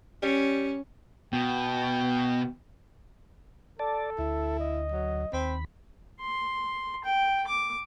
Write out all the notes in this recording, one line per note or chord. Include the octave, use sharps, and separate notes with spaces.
G3 C#4
B2 B3 G5
A4 D5 A5
D2 E4
D#5
F#3
D#2 C4 B5
C6
G5
D6